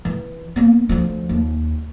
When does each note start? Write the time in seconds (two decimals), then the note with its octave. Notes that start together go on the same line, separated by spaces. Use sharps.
0.05 E3
0.56 A#3 B3
0.89 D2 F3
1.29 D#2